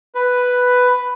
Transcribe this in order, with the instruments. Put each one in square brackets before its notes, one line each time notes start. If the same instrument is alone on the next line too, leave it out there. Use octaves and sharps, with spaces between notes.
[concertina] B4